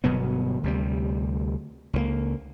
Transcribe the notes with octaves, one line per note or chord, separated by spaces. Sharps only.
G1 B2 F#3 B3
D2 C3 G3
C#2 G3 A#3